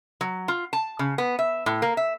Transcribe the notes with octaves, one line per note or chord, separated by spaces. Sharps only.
F#3
F4
A5
C#3
B3
E5
A2
A#3
E5